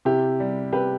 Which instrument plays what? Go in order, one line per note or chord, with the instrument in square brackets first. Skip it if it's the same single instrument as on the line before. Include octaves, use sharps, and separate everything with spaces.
[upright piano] C3 E4 G4
G3
C3 G4 B4